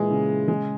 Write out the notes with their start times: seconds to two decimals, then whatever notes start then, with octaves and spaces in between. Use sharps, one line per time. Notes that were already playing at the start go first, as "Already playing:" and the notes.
Already playing: A#2 E3 G#3 G#4
0.11 C#3
0.48 G#3